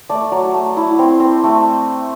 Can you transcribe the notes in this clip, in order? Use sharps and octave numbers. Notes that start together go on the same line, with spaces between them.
A3 D5
F#3
A3
E4
C4
C4
A3